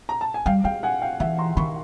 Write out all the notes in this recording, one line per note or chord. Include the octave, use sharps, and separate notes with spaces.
A#5
A5
G#5
G3 F5 G5
G#3 F5 G5
F#5 G#5
F5 G5
E3 E5 F#5
A#5 C6
D#3 B5 C#6